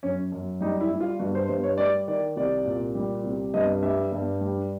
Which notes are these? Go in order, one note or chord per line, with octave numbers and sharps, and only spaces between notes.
F#2 C#4
F#2
G3 D#4
E4
G3
F4
G2 F#4
C5
G2 C5
C#5
G3 D5
D#3 D5
C2 D5
A#2
G3
C2
G2 D#5
G3 E5
G2
G3